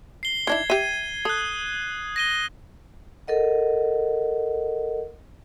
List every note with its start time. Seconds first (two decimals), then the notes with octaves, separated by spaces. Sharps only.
0.23 C7 G7
0.47 D#3 D4 E4 G#6
0.70 G4 E5 D#7
1.25 A4 D#6 F#6
2.16 A#6 D#7 G7
3.28 A4 A#4 D#5 F#5